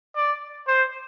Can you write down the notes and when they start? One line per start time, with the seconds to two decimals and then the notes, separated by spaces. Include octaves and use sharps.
0.16 D5
0.67 C5